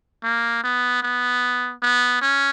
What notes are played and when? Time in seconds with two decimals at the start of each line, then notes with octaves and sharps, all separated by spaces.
0.24 A#3
0.64 B3
1.02 B3
1.82 B3
2.21 C#4